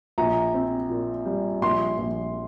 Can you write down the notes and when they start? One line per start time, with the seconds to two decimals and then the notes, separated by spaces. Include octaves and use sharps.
0.18 A#1 A#5
0.54 C4
0.90 A#2
1.26 G3
1.62 A#1 C6
1.98 A#1